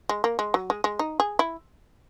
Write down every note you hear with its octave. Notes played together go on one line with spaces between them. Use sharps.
G#3
A#3
G#3
F#3
G#3
G#3
D#4
G#4
E4